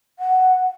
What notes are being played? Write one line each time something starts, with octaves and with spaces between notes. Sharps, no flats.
F#5